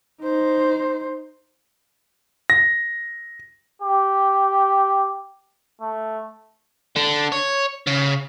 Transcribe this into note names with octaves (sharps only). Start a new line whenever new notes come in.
D#4 C5
A#6
G4
A3
D3
C#5
C#3